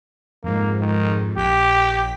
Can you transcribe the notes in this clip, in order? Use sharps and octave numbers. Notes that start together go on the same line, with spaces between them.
F2 G#2 A#3
D#3
A#1 G4 G5 B6